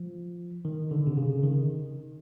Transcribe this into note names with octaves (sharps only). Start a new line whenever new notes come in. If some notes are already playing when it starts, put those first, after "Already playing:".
Already playing: F3
D#3
D3
C3
C#3
D#3